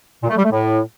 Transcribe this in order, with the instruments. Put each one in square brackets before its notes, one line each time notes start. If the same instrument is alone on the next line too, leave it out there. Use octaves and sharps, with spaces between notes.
[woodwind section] A#2
A3
G3
A3
A2